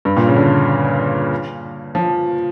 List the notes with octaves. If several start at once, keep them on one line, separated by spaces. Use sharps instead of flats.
G2
A#2
C#3
D3
F3